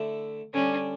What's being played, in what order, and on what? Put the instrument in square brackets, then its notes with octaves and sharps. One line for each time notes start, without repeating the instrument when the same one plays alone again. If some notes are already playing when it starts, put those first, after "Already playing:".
Already playing: [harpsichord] D3 A3 E4
[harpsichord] D3 G3 D4 [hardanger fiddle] C#4